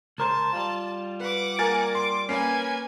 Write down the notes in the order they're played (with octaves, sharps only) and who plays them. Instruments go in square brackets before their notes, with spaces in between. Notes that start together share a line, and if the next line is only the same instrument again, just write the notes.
[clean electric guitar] C#2 A#4 C5 [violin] A5
[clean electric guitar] G3 F4
[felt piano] B4 [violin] F#5 D6
[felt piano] A#3 [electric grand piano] A#4 G#5 A6
[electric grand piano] C6 [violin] D6
[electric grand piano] A#3 C#4 [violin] B4 G#5 [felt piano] C7